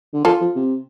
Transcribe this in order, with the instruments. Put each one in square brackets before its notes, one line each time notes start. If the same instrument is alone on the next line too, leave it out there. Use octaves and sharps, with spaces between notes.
[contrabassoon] D3
[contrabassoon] F3 [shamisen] F4 A4
[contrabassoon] F3
C3